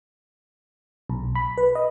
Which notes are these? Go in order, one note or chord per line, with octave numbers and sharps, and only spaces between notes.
B1
B5
B4
D#5